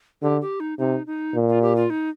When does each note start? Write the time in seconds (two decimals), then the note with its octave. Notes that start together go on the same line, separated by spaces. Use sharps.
0.22 D3 G4
0.41 G4
0.60 D#4
0.78 C3 D#4
1.07 D#4
1.34 A#2
1.49 F4
1.62 G4
1.76 F4
1.90 D#4